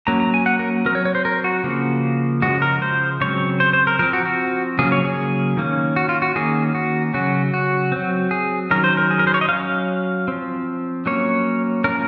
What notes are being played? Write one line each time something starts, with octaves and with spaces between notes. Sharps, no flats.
F#3 A#3 C#4 A#5
A#5
G#5
F#5
A#4
F#3 C4 A#4
C#5
C#5
C5
A#4
F#4
C#3 F3 A#3
C#3 F3 G#3 F#4
A#4
C5
C#3 F#3 C4 C#5
C5
C5
A#4
F3 C4 A#4
F#4
F#4
C#3 F#3 A#3 C#4 G#4
C#5
G#4
D#3 A#3 C#4
F#4
F4
F#4
D#3 A#3 C#4 G#4
F#4
C#3 F#3 C#4 F#4
F#4
F#3 C4
G#4
D#3 F#3 C#4 A#4
C5
A#4
G#4
A#4
C5
C#5
D#5
F#3 C#4 F5
F3 C4
F#3 A#3 C#4 C#5
F3 A#3 C#4 A#4